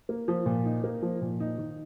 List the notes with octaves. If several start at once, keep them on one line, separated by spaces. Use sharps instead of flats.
A#3
F3
A#2
D#4
A#3
F3
A#2
D#4
D#3